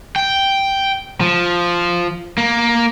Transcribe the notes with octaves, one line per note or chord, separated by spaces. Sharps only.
G5
F3
A#3